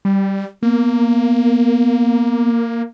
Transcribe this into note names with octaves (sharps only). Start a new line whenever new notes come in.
G3
A#3 B3